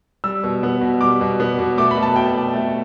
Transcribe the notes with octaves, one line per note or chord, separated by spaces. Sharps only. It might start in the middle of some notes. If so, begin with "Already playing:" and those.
G3 E6
B2
B3
B2
G3 D6
B2
B3
B2
A3 D6
B5
B2
A5
B2 G5
A3
A3